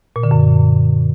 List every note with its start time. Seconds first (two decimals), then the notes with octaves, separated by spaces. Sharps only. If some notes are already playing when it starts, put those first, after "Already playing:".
0.16 A#2
0.23 D3
0.31 F#2